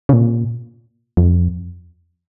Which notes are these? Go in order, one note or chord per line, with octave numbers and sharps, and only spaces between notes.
C#3
A#2
F2